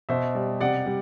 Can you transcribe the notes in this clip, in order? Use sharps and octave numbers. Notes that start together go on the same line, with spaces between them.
B2 C5 E5
G3
C3 D5 F#5
G3